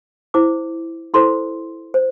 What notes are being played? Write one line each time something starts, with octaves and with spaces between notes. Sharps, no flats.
E4 C5 D6
E4 A4 C5 C6
C5